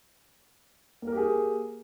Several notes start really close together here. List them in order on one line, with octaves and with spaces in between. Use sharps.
A#3 A#4 G4 G#4